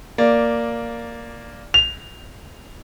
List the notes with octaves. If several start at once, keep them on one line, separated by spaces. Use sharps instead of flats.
A#3 D5
F7